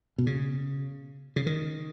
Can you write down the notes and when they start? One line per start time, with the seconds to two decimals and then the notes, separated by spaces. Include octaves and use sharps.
0.18 B2
0.27 C#3
1.36 C#3
1.46 D#3